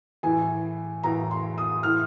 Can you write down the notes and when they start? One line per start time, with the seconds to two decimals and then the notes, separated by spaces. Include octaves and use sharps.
0.23 A2 E3 G#5
1.03 A2 E3 A#5
1.31 C6
1.58 D#6
1.83 A2 E3 F6